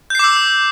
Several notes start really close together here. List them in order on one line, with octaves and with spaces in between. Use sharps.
G6 C7 D6 E6